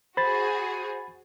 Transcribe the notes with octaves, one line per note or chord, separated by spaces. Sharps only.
F#4 G#4 C5 B5 A6